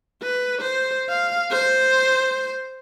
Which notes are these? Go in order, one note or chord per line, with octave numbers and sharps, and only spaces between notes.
B4
C5
F5
C5